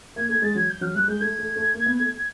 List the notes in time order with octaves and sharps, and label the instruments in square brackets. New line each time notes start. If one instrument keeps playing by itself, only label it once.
[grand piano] A#3 [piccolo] G#6
[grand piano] A3 [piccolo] G#6
[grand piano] G#3 [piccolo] A6
[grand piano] F#3 [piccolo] G#6
[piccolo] G6
[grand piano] F#3 [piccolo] F6
[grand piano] G3 [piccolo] F#6
[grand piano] G#3 [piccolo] G6
[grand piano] A3 [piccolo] G#6
[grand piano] A3
A3
A#3
B3
A3